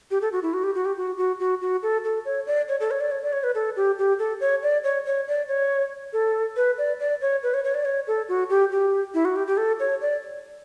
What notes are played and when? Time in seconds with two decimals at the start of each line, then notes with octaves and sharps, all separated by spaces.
0.11 G4
0.22 A4
0.32 F#4
0.43 E4
0.54 F#4
0.64 G4
0.75 F#4
0.85 G4
0.97 F#4
1.17 F#4
1.40 F#4
1.62 F#4
1.83 A4
2.04 A4
2.25 C#5
2.47 D5
2.69 C#5
2.80 A4
2.91 C#5
3.00 D5
3.11 C#5
3.23 D5
3.33 C#5
3.44 B4
3.55 A4
3.76 G4
3.98 G4
4.19 A4
4.40 C#5
4.63 D5
4.84 C#5
5.06 C#5
5.28 D5
5.48 C#5
6.13 A4
6.56 B4
6.78 D5
7.00 D5
7.21 C#5
7.43 B4
7.54 C#5
7.64 C#5
7.75 D5
7.85 C#5
8.07 A4
8.29 F#4
8.50 G4
8.72 G4
9.14 E4
9.25 F#4
9.36 G4
9.47 G4
9.57 A4
9.80 C#5
10.01 D5